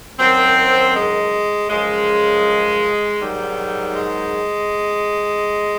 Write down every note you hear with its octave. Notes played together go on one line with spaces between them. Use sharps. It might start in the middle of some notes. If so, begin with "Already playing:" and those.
F#2 D#3 F#3 C4
G#3
F#2 C#3 F3 G#3
G#2 D#3 F#3 G3
G#3